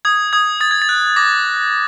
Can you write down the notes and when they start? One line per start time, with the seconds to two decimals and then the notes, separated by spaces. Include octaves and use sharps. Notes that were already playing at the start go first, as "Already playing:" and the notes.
0.05 D#6 G#6
0.33 D#6 G#6
0.60 D#6 A6
0.71 G#6
0.82 A6
0.89 F#6
1.16 D6 A#6